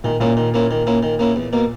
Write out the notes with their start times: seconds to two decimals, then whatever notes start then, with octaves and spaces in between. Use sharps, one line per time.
0.04 A#2 D#3
0.20 A#2 A#3 C#4 E4
0.37 D#3
0.54 A#3 C#4 E4
0.71 D#3
0.87 A#3 C#4 E4
1.03 D#3
1.19 A#3 C#4 E4
1.36 E2
1.53 B2 A#3